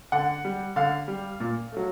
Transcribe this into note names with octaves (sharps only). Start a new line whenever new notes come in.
D3 F#5
G3
D3 F5
G3
A#2
F#3 A3